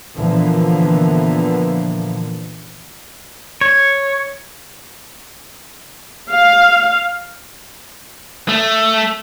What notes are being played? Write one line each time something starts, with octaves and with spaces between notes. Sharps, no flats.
A#2 D3 E3 F3 A#3 B3
C#5
F5
A3